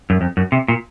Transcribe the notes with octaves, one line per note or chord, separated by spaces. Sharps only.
F#2
F2
F#2
C3
A#2